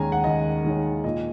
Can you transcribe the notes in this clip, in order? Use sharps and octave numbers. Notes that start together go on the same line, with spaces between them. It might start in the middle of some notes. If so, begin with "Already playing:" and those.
Already playing: D#2 D#3 G#3 C#4 G#5 A#5
F#5
D#2 D#5
D#3 G#3 C#4
A#2 D#5